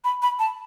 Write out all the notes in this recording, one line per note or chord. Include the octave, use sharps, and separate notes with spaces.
B5
B5
A5